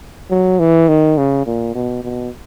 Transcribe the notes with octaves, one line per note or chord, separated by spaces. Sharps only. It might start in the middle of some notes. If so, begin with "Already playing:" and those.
F#3
E3
D#3
C#3
A#2
B2
B2